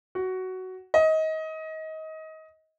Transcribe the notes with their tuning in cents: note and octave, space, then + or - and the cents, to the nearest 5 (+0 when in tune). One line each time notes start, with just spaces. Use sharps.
F#4 +10
D#5 +25